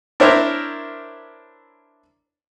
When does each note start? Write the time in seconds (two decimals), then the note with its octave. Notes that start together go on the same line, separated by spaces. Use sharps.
0.20 D4 E4 A#4 C5 C#5 E5